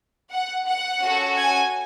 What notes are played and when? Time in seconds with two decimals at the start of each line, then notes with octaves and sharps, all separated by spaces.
0.30 F#5
0.66 F#5
1.01 C#4 F#4 A4
1.35 G#5